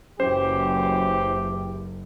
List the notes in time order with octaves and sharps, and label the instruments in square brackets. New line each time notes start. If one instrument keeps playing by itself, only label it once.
[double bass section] F#1 [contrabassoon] F#2 [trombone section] E3 G4 [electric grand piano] C5